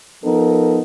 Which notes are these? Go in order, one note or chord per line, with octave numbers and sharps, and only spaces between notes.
F3 B3 D#4 A4 A#4